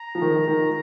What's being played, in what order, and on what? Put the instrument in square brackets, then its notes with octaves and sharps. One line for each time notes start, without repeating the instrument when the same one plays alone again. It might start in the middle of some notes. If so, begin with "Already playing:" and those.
Already playing: [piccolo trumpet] A#5
[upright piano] F3
D#3
D#3